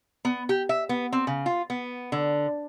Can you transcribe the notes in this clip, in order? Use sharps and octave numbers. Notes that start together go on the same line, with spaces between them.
B3
G4
E5
B3
C4
C#3
F4
B3
D3